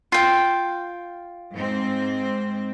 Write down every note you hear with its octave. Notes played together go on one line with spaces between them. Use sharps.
F4 G5
G#2 C4